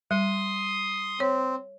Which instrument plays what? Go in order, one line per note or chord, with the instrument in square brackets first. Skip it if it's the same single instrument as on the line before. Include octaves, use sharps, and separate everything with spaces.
[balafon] G3 [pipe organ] C6 D#6
[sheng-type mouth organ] C4 [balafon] C#5